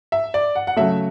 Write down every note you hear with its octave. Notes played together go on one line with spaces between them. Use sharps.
E5
D5
F#5
F#5
C#3 F#3 A3 E5